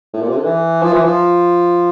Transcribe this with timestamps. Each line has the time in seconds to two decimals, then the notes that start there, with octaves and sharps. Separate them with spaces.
0.14 A2
0.22 A#2
0.29 C3
0.37 D3
0.45 E3
0.83 F3
0.93 E3
1.04 F3